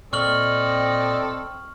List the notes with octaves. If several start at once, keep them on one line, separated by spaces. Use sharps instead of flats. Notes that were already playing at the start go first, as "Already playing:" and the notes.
A#2 C4 A4 D5 D#5 C#6 F6 F#7